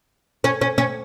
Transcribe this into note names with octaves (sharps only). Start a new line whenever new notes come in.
C#4
C#4
C#4